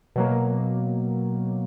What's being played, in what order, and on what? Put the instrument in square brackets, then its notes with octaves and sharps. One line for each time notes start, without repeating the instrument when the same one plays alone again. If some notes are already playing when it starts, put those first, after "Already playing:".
[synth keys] B2 F#3 A#3